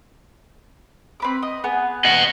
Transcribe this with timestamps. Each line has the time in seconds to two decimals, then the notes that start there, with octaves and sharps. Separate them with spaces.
1.20 C4 B4 D6
1.42 D#5
1.64 B3 G#4 B4
2.05 D#5 F#5